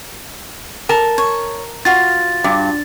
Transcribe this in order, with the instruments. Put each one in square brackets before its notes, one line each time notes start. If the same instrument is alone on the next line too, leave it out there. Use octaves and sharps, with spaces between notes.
[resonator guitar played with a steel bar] A#4 A5
[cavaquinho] C#5
[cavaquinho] F4 F#4 F5 [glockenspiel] A6
[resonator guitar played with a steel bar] G2